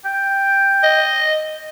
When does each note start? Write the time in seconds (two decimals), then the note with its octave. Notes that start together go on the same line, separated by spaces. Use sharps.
0.05 G5
0.83 D#5